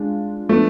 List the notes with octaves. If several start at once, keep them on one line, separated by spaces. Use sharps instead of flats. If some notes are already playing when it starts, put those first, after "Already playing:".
Already playing: G#3 D4 F4
F3 A3 B3 D4 A4